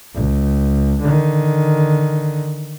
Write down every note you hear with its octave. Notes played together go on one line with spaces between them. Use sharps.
C#2
D3 D#3